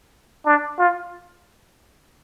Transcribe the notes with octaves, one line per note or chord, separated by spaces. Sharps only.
D4
F4